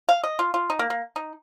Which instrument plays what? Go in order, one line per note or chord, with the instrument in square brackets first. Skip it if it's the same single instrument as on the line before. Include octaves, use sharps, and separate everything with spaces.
[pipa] F5
D#5
F4
F4
D#4
A#3
A#3
D#4